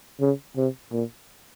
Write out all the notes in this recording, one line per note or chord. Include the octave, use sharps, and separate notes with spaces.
C#3
C3
A#2